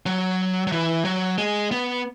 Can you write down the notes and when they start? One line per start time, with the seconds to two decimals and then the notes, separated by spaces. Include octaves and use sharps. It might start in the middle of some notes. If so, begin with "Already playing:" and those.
0.06 F#3
0.67 F#3
0.72 E3
1.05 F#3
1.38 G#3
1.71 B3